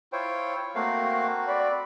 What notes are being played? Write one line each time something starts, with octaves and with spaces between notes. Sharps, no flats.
E4 F4 C5 C#5 G5
A3 A#3 C4 F#4 F5
D5 B5